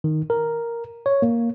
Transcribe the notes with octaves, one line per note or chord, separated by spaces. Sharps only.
D#3
A#4
C#5
A#3